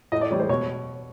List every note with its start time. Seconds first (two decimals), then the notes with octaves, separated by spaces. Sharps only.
0.12 A2 D#5
0.21 D5
0.31 E3 G3 C#5
0.40 C5
0.49 B2 C#5